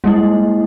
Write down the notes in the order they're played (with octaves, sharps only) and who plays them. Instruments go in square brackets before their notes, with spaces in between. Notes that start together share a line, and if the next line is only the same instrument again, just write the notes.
[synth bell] G3 A#3 E4 [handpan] G#3